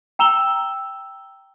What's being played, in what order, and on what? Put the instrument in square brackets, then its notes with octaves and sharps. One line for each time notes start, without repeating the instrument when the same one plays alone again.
[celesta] G5 A#5 E6 E7 F7 G7